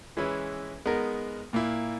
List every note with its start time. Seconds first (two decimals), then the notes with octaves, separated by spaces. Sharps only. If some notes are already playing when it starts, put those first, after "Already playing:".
0.17 E3 G#3 C#4 E4 B4
0.86 G#3 B3 D#4 A#4
1.53 A#2 A#3 E4